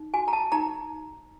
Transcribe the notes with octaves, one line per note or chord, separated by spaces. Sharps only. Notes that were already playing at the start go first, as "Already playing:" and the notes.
Already playing: D#4
F#4 G#5
A#5
A5
D#4 A#5